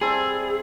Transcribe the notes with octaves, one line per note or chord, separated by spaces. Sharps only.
G3 C4 E4 G#4 A4